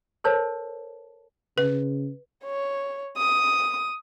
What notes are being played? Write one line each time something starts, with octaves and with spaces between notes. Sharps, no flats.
A4 A#4 C5 C#5 A5
C#3 B4
C#5
D#6